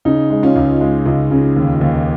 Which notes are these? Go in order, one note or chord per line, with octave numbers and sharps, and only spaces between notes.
C#3 D#4
G#3
C#4 F4
C#2
G#3
C#2
C#3
D#2
D#2